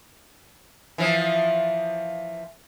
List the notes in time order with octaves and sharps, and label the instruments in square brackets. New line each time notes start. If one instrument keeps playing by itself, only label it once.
[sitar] E3 F3